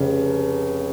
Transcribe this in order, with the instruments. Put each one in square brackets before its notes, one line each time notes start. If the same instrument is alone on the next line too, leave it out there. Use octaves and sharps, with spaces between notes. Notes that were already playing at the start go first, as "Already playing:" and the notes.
Already playing: [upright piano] F1 C#3